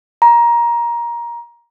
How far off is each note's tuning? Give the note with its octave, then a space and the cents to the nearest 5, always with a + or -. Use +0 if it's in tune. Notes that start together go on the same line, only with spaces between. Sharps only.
A#5 +20